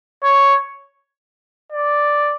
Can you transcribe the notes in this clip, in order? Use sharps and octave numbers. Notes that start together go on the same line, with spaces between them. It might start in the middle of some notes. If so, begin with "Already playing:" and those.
C#5
D5